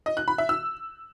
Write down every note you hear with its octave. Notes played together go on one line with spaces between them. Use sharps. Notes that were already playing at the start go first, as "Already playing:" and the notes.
D#5
F#6
B5
E5
E6